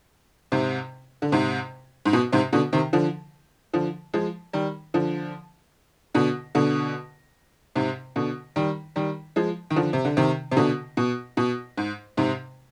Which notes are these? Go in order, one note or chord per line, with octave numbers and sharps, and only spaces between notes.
G#2 C3
D3
G#2 C3
G#2
B2
G#2 C3
B2 D3
C3 D#3
D3 F3
D3 F3
F3 G#3
D#3 G3
D3 F3
B2 D3
B2 D3
G#2 C3
B2 D3
D#3 G3
D#3 G3
F3 G#3
D#3
D3 F3
C3
D3
C3 D#3
C3
B2 D3
B2
B2
G#2
G#2 C3